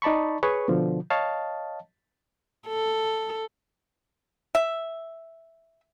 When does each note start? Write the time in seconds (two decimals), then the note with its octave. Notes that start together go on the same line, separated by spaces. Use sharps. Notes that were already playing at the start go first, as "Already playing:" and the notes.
0.02 D#4 D5 A5 B5 C#6
0.43 G#4 B4 C#5 C#6
0.68 B2 D3 F3
1.10 C#5 D#5 F5 A5
2.68 A4
4.55 E5